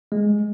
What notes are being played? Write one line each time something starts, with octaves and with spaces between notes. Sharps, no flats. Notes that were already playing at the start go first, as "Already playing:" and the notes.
G#3